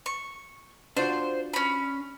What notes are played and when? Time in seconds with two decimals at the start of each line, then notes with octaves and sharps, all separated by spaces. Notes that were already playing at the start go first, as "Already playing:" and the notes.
0.06 C#6
0.97 D4 F4 F#4 C5
1.54 C#4 B5